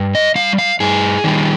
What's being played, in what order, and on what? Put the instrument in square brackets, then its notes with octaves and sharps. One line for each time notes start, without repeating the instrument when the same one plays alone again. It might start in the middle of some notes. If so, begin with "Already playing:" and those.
Already playing: [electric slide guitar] G2
D#5
G3 F5
F5
G2 G#4
D#3 G3